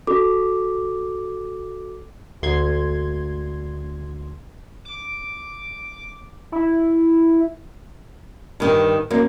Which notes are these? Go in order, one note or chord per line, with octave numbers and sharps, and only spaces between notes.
F#4 A4 D6
D2 C6 G#6
D6
E4
G2 D#3
F#2 A#3